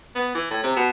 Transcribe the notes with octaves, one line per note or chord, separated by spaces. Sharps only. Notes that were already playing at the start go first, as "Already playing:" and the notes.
B3
E3
A2
C3
B2